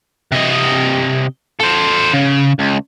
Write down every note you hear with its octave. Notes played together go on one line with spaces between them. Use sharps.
C3 D#5
A4 C5
C#3
C#2